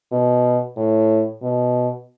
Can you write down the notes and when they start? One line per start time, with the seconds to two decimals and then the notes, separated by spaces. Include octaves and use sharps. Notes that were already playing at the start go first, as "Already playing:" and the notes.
0.12 B2
0.77 A2
1.42 B2